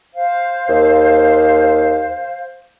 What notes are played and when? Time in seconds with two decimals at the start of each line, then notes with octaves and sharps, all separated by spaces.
0.13 C5 F5
0.68 D#2